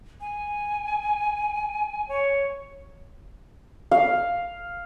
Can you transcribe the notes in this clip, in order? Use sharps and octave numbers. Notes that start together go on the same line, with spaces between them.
G#5
C#5
F5